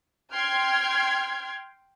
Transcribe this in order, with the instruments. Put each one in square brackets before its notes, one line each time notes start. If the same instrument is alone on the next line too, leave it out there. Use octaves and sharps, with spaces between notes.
[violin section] G5 C6 F6 G#6